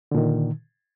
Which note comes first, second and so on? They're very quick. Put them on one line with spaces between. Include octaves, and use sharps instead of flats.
D3 A#2 D#3